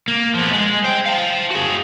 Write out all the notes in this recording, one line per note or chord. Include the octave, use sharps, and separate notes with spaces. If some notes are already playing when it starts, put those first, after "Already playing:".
A#3
F3 B3
G#3
C5 G5
F5 A5
F#4 G#4